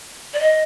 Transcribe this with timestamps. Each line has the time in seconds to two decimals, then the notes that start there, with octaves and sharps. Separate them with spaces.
0.33 D5
0.39 D#5